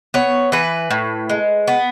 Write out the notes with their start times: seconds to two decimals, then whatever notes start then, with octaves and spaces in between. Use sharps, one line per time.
0.14 B3 C#5
0.52 E3 B4
0.91 A2
1.30 G#3
1.68 B3